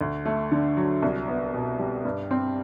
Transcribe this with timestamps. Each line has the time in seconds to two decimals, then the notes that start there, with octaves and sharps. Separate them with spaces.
0.01 D2
0.26 A3
0.51 D3
0.77 F#3
1.02 C2
1.28 B3
1.54 B2
1.79 G3
2.05 G2
2.31 C4